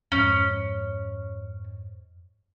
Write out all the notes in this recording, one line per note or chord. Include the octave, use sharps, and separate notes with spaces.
F2 G#2 C#4